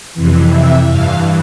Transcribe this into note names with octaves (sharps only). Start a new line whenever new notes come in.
F2 C3 E3
E5
G2 E3 F5